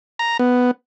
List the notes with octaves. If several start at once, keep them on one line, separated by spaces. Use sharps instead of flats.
A#5
B3